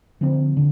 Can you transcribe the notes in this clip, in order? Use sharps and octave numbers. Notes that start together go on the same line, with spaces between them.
D3 F3 C4
D3